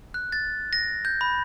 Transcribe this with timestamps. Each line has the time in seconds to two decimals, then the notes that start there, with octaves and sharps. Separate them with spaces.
0.14 F#6
0.32 A6
0.73 A#6
1.05 G6
1.21 B5